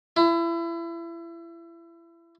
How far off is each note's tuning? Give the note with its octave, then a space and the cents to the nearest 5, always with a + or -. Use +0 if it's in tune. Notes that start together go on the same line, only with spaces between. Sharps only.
E4 +30